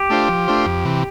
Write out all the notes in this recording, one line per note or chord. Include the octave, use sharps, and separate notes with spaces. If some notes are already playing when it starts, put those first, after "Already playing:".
Already playing: G4
A3 D4 F4 C5
F3
A3 D4 F4 C5
F2
C3 E3